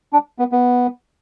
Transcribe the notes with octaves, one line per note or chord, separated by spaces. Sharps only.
D4
B3
B3